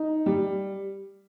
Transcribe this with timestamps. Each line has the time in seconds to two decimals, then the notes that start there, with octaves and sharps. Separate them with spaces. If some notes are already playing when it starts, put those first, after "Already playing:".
Already playing: D#4
0.26 G3